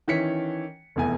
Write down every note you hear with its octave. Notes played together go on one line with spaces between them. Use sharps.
D#3 E3 C#4 B6 C#7
F1 E2 G#5